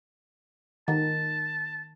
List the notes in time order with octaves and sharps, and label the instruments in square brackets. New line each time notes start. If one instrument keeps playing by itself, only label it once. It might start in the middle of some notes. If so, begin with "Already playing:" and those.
[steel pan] D#3 [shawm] A5